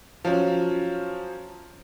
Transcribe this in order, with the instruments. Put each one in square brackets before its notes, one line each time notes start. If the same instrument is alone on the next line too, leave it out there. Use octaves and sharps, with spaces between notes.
[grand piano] F3 F#3 C#4